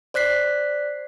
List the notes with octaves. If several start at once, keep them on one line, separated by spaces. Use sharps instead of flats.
C5 D5 F#6 B6 C7